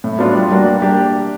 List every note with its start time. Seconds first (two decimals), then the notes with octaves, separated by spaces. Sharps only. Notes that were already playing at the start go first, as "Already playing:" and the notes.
0.04 A2
0.19 F#3 B3 D4 F4
0.35 G3
0.51 A#3 D4 F#4
0.66 G3
0.82 A#3 D4 G4